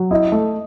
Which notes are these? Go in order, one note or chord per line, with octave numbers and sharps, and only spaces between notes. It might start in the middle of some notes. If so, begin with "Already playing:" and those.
Already playing: F#3
E4 D#5
A3